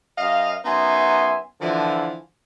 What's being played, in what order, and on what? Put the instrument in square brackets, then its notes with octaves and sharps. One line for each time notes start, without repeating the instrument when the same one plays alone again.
[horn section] F#2 D#5 F5
F#2 B3 D#4 E5 G#5 C6
D3 E3 F3